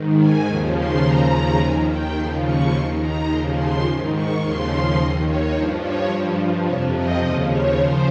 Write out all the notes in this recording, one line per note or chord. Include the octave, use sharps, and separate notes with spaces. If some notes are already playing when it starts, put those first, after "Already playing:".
Already playing: G#2 D#3
G#5
D#2 C#3 F3
C6
D#2 C#3 F3 A#5
D#2 D#3 G#5
G5
D#2 C#3 F3 C6
C#6
D#2 D#3 C6
A#5
D#2 C#3 F3 C6
C6
G#2 D#3
C#6
D#2 C#3 F3 C6
D#2 D#3 D#5
C#5
G2 F3 C5
C#5
G2 F3
F2 C3 F3 C#5
D#5
D#2 C#3 F3 D#5
C#5
C#3 F3 C5